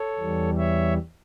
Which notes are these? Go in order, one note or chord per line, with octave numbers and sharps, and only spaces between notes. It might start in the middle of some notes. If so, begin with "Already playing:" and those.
Already playing: A4 C#5
E2 E3 G3
C#5 E5